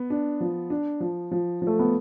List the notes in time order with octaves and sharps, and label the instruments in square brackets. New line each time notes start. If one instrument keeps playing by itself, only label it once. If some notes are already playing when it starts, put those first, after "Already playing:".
Already playing: [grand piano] B3
[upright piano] D4
F3
D4
F3
F3
F3
[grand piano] A3
B3